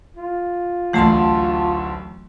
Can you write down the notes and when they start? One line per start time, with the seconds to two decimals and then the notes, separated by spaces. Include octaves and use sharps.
0.17 F4
0.93 D1 A1 D2 E3 A3 F#5 A5 C6